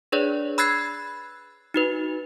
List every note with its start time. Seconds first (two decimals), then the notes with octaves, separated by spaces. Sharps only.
0.12 D4 G#4 B4 C#5 D5
0.58 B5 E6 F#6 G#6 A6 C7
1.74 D#4 F#4 B4